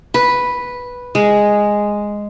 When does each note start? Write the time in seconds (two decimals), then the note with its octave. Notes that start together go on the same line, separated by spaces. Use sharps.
0.14 B4
1.15 G#3